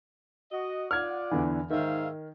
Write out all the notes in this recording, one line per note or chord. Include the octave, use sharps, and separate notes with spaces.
F#4 D#5
F4 D5 F#5 F6 G#6
E2 D3 E3
G#2 D#3 E5 F5